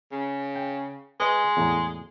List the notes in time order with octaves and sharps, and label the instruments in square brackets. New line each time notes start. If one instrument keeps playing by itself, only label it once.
[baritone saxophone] C#3
[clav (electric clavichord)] G5
[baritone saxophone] G#3 [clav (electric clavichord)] B4 D#5
[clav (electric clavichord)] E2 A2 A#5